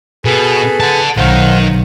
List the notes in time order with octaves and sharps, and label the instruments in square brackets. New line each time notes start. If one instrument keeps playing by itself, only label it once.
[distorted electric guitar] B2 [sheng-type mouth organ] G#4 A4 B4
[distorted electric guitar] F#5 A5
[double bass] B1 [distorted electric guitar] D#3 [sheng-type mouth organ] C5 F5 F#5